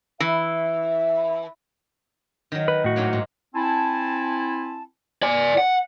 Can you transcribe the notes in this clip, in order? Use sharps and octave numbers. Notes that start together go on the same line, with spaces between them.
E3 E5
D#3 F#3
B4
A2 F#4
G#2 F#3 A#3
G#2
C4 E4 G#5 A5
D5 G#5
F#5